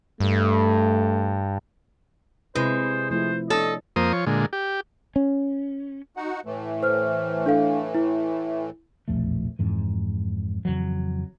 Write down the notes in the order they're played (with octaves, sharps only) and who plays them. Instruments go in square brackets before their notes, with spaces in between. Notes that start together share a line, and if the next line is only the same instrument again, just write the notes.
[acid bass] G2 [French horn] A3
[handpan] C3 E4 B4 [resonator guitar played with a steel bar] G#3 [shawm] C5
[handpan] F3 A3 E4 [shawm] C5
[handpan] D4 C#5 [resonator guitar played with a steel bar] A4 [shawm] D#5
[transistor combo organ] F2 A#3 C5 D#6
F3 C#5
A#2 D3 G#3
G4
[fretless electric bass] C#4
[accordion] D#4 F#4 F#5
A2 E3 A3
[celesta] C5 F6
D4 A4 F5
E4
[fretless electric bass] E1 A#1 F2 A3
F2 G#2 E3
F2 C#3 E3 F#3